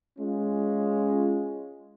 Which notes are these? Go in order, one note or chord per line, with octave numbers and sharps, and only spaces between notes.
G#3 C#4 F4